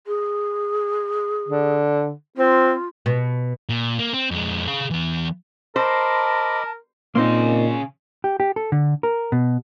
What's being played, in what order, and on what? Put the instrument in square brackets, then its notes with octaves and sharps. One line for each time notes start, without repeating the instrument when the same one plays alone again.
[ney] G#4
[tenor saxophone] D3
[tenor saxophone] C4 [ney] F4
[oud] B2
[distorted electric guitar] A#2
A#3
C4
F2 G#3
G#4 F5
E3 B3
[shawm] A#4 [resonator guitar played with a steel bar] C5 [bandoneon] D#5 B5 D6 [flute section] A5
[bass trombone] A#2 [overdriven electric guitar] C#3 C6 [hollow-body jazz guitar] A#3 C4 D#4
[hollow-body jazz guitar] G4
G4
A4
D3
A#4
B2